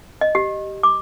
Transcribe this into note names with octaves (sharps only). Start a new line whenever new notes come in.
D#5
G4
D6